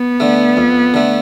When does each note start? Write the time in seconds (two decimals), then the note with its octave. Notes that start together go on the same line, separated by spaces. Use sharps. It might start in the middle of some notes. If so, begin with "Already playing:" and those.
Already playing: B3
0.20 D3 A3
0.57 F2
0.94 D3 A3